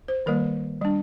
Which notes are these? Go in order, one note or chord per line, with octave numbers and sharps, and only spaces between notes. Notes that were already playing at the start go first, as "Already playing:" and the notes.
C5
D#3 G3 A#3 A#4
G3 D4